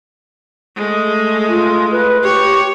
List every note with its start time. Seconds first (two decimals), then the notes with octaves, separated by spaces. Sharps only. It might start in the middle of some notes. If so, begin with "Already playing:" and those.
0.76 G#3 A3
1.48 F4
1.91 B4
2.23 G4 C#5